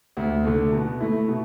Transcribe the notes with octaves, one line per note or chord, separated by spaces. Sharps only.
D2
D3 A3
B2
A3 E4
B2